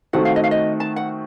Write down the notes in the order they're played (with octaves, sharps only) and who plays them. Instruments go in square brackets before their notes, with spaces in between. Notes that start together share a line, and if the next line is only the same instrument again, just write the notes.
[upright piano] D#3 A3 C4 D#4 F#4 [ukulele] F#5
[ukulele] F5
D#5
F5
D#5
A5
F#5